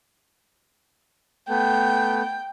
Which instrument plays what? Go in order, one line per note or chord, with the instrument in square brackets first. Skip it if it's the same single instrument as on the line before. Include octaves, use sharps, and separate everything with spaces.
[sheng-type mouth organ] A3 B3 [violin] G5